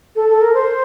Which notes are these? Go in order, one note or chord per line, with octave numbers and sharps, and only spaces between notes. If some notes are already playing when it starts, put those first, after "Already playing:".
A4
A4
A#4
C5